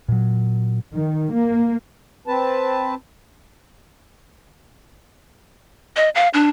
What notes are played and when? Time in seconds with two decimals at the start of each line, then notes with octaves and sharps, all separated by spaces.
0.08 A#2 F#3
0.94 D#3
1.33 A#3
2.28 C4 B4 A5
5.96 D#5
6.15 F5
6.34 D4